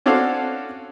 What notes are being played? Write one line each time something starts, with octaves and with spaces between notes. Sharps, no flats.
C#4 D4 F#4 A4 C5 F5